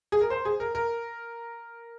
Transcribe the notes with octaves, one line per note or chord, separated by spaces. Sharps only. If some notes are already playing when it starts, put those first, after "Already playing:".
G#4
A#4
C5
G#4
A#4
A#4